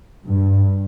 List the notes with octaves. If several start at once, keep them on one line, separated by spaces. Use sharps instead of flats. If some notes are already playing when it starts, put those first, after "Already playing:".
G2